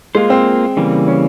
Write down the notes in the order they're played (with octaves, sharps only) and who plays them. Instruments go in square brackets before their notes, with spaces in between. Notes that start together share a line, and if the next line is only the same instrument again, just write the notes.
[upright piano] G#3 [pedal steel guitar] A#3 F4 C5
[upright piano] C4
[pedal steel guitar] C#3 E3 G3 A#3
[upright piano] C#4